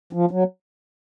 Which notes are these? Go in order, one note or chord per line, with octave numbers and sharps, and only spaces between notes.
F3
F#3